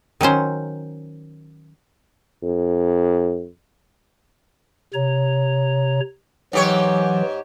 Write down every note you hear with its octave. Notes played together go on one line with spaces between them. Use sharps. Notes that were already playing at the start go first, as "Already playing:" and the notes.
D#3 F#3 C#4 C5
F2
C3 C#5 A#5
G#2 E3 F#3 G4 C#5